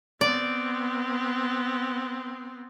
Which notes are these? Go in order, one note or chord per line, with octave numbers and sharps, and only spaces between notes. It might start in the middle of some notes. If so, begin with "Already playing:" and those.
B3 C4 D5